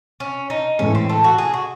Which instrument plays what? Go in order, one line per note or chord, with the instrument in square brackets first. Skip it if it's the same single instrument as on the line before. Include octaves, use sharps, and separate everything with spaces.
[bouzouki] C#4
D#4
[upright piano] A2 E3 G#3 [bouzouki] C#4
[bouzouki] C4
A3
F#4
G#4
F#4